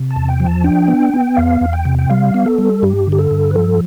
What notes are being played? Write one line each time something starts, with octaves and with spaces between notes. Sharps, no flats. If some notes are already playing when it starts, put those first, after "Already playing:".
Already playing: C3
A5
E2
G5
F3
A5
D4 G5
B3
B3
E2 F5
E2
G5
C3
G5
G3 F5
B3
A4
G3
G2 G4
D3
G4
A4
G2
B4
F3 A4